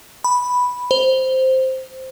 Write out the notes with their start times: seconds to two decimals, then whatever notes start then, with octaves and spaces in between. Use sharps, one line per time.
0.24 B5
0.91 C5